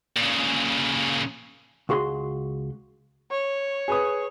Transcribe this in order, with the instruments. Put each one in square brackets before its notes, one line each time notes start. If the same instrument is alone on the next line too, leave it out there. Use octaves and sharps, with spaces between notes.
[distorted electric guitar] A#2 C#3
[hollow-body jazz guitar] C#2 F#4 G#4 C6
[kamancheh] C#5
[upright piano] G#4 B4 D#6